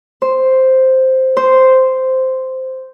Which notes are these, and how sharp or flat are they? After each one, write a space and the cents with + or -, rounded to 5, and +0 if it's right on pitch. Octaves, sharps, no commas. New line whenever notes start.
C5 +0
C5 -5